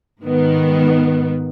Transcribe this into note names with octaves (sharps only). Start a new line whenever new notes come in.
G#2 D#3 B3